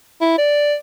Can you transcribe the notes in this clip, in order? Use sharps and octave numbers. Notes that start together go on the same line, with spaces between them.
E4
D5